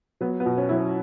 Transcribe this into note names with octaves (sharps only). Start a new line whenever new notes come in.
F#3 B3
B3
B2
C#4
F#3 E4
C#4